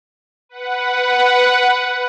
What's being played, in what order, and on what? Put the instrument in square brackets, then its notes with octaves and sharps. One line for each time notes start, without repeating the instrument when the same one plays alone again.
[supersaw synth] B4 F#5